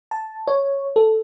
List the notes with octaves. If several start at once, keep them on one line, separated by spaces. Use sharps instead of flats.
A5
C#5
A4